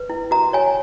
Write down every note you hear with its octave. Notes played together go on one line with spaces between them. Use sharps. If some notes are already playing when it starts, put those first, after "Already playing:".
Already playing: B4
E4
F#4 A#5
C#5 G#5